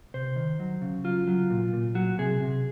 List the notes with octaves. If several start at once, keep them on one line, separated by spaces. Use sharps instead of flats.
C3 C5
D#3
F#3
C#3
F#3 F4
F#3
A#2
A#2
F#3 F#4
C3 G#4
C3